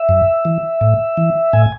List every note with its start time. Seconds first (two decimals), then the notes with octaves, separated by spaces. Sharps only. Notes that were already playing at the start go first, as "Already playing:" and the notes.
Already playing: E5
0.09 F#2
0.45 E3
0.81 A2
1.17 E3
1.53 A2 G#5